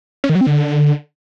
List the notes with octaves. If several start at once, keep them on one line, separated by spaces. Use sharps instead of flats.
C#4
D#3
F#3
C4
D3